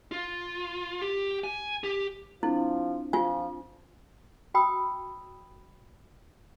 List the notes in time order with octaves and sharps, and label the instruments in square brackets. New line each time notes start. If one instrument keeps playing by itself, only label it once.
[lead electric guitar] F4
G4
G#5
G4
[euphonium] F3 [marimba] C4 D4 [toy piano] E4
[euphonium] F3 [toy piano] F4 G#5
[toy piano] F#4 G5 B5 D#6 E6